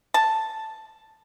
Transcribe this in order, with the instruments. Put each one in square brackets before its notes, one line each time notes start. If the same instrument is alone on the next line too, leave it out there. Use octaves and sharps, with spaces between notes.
[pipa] A5